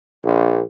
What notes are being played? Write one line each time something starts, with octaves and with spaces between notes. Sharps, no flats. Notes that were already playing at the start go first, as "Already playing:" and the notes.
A#1